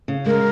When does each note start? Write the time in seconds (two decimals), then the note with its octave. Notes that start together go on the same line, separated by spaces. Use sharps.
0.08 C#3
0.26 G#3 A#4